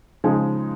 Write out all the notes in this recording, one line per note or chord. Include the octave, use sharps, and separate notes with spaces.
C#3 F3 G#3 D#4 G#4